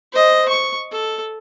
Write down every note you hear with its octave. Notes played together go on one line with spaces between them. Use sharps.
C5 D#5
C#6
A4